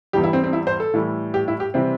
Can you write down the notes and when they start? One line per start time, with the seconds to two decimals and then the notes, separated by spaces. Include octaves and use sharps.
0.13 E2 E3 G3 G4
0.23 E4
0.33 C4
0.44 C4
0.53 E4
0.67 C5
0.80 A4
0.93 A2 E3 G3
1.34 G4
1.48 E4
1.60 G4
1.74 C3 E3 G3 C4